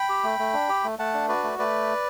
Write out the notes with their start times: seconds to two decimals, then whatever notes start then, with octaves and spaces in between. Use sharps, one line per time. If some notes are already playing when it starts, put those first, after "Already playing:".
Already playing: G5 B5
0.09 G4
0.24 A3
0.39 A3
0.54 D4
0.69 G4
0.84 A3
0.99 A3 F#5 A5
1.14 D4
1.28 F#4 B4 D5
1.43 A3
1.59 A3 B4 D5